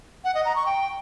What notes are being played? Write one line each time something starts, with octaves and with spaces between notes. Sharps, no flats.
F#5
D#5
A#5
C#6
G5